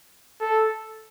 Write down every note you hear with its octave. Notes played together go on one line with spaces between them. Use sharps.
A4